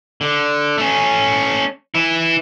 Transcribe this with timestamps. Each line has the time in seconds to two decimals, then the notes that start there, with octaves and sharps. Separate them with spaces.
0.21 D3
0.78 A3 C#4
1.95 E3 E4